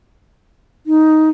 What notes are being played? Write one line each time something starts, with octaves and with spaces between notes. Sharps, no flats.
D#4